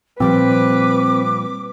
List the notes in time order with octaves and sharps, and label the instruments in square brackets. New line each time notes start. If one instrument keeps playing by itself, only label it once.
[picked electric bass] A#2 F3 G3 [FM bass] C4 [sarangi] B4 [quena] D6